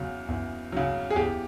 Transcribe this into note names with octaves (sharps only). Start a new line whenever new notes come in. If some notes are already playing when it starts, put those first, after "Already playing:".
Already playing: E2 C#3 F#3
E2
C#3 F#3
G#4
E2 G4